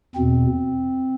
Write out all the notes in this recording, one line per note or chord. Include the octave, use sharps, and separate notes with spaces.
E2 B2 C4